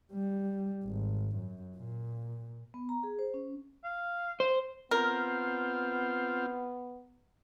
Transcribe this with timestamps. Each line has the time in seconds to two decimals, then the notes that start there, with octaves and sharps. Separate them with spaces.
0.13 G3
0.84 G#1
1.37 F#2
1.77 A#2
2.74 B3
2.89 A#5
3.03 G#4
3.19 C5
3.34 C#4
3.84 F5
4.40 C5
4.91 B3 C4 F4 A#4